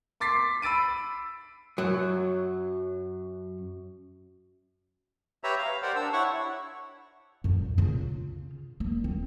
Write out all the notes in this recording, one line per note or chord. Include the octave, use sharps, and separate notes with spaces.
C6 D6 A6 B6 C7
B5 E6 A6 D7 D#7
F#2 F#3
G4 B4 C#5 E5 A#5
F5 F6
G4 A#4 C5 D5 F#5
D4 E6
E4 C#5 F#5 C#6
F#2
C#3 F4
A#3
C4